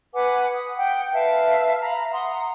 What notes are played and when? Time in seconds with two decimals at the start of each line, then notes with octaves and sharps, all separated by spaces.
0.14 B4 F#5 G#5 D6
0.53 D#6
0.76 F#5 G5
1.13 B4 E5 F5 A5
1.82 A#5 B5
2.12 F#5 A#5 C6 D#6